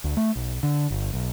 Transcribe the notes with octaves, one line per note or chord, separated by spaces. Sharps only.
D2
A3
B1
D3
G1
B1